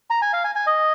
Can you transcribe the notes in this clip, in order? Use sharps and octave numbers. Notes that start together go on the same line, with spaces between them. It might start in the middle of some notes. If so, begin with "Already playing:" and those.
A#5
G#5
F5
G#5
G#5
D#5